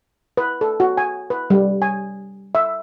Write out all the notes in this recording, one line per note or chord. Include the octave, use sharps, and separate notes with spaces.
B4
A4
F#4
G#5
B4
G3
G#5
E5